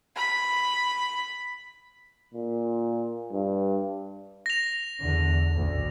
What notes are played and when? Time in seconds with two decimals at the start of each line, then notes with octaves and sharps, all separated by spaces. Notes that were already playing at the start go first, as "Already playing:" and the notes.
0.16 B5
2.34 A#2
3.33 G2
4.46 A#6 F7
4.99 E2 D3
5.53 A1 D2